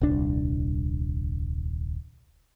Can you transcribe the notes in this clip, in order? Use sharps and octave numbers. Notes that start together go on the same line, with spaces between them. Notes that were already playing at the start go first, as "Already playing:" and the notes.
D#1 C2 D4